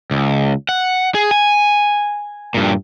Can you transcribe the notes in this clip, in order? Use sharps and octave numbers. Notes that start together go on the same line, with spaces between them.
C#2
F#5
G#4
G#5
G2 A#2